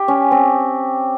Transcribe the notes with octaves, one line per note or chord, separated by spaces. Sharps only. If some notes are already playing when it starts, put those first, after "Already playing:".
Already playing: G4
C#4
C4